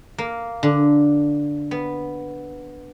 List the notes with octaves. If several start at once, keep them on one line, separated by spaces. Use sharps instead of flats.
A#3
D3
B3